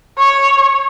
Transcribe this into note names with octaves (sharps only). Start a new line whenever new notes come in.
C#5